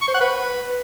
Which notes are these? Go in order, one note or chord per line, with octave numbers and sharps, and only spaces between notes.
C#6
C5
F#5
B4